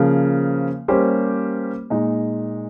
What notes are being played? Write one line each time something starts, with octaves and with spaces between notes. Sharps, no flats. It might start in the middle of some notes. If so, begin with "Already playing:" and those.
Already playing: C#3 F3 A#3
G3 A#3 C#4 G4 C5
A#2 G#3 D#4